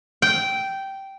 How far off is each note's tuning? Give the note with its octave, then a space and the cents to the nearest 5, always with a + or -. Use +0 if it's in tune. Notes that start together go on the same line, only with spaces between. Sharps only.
G5 -10